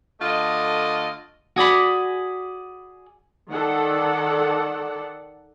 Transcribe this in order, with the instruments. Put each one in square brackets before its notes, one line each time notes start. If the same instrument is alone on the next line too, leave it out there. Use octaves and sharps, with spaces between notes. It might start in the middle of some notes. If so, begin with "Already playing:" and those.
[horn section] D3 A3 F4 D#5
[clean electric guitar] F#4 G#4 D5 B5
[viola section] D#3 A4 D5 F#5